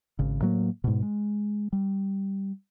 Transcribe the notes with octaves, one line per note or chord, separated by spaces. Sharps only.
G#1 C#3
A2 F#3 A#3
G#2 B2
G#3
G3